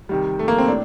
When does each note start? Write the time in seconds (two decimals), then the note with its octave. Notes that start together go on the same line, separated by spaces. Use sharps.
0.09 C3 D#3 G3
0.39 A3
0.48 A#3
0.58 C4
0.68 A2 D4